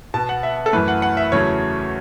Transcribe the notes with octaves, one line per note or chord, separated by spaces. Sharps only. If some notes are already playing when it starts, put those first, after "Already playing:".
B2 B3 A5
F#5
E5
A4
F#2 E3 A3 B4
F#5
F#5
E5
E2 C#3 F#3 A3 C#5